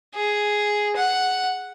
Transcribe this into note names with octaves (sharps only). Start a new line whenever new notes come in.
G#4
F#5